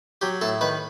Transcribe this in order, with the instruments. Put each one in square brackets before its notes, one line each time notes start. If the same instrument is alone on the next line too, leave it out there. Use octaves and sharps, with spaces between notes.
[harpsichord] F#3 G4
A2 A4
D#3 B4